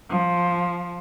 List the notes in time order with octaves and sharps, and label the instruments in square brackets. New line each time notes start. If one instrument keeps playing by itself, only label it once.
[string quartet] F3